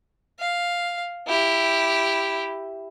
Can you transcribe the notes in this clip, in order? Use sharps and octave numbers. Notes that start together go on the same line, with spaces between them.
F5
E4 G4